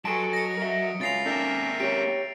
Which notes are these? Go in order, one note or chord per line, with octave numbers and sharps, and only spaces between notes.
F#3 F#4 A4 D#5 G#5 A5 C6 D7
D#5 A#6 C#7
A#4 E5
C#3 G#3 F4 A6 C7 F7
A#3 C#4 A4 A#4 D5 E5 G5
G4 C#5 D7